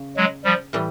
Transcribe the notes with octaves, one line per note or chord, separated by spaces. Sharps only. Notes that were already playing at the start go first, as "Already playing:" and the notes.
Already playing: C#3
F#3 G#3
F3 G3
A2 E3 G3